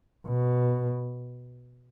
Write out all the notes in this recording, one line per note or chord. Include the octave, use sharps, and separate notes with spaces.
B2